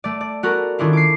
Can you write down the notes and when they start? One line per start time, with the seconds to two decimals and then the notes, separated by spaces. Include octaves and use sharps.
0.04 A3 D5
0.21 D5
0.43 B3 F#4 A4 A#4
0.79 D#3 C#4 D4 E4 F4
0.93 D6 C7